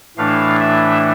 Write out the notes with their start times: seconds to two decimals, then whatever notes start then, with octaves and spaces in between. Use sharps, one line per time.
0.17 A2 E3 A3 D4 F5
0.60 E5